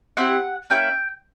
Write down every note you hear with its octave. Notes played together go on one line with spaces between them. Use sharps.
C4 E4 G4 F#5 F#6
A#3 C#4 E4 G5 G6